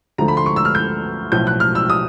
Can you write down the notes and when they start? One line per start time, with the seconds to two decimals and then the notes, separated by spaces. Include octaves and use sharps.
0.18 D2 D3 F3 A3 A#5
0.28 B5
0.37 C6
0.46 C#6
0.56 E6
0.65 F6
0.75 G6
1.32 B1 A2 F3 G6
1.47 F#6
1.60 F6
1.75 E6
1.90 D#6